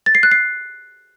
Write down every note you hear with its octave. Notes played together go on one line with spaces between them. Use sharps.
A6
C7
F#6
C7